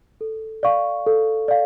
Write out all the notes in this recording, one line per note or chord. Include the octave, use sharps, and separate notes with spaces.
A4
D5 F5 C#6
A4
D5 F5